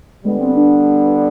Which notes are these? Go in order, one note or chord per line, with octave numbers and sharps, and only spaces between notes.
D3 G3 G#3 B3
C4
D4